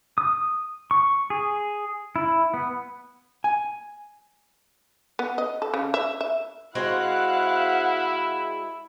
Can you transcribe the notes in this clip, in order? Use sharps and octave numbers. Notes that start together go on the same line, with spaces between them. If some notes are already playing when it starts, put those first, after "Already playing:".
D#6
C#6
G#4
E4
B3
G#5
B3
D#5
A4
C#3
E5
E5
G#3 C4 E4 F#4 F5 F#5 F#6